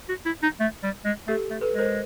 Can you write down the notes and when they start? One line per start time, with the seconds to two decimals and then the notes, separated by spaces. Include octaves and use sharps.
0.09 F#4
0.26 E4
0.43 D#4
0.60 A3
0.83 G3
1.05 G#3
1.27 A3 G4 A4
1.50 A3
1.61 A4 B4
1.74 G#3
1.79 A#4 C5